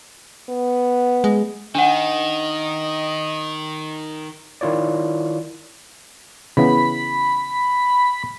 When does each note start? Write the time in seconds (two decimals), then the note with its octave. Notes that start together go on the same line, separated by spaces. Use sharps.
0.49 B3
1.24 G#3
1.75 D#3 D4 D#5 F#5
4.61 D#3 E4 F4 C#5 D5
6.57 C#3 E3 B3 B5